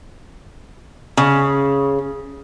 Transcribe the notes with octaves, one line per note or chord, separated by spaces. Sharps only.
C#3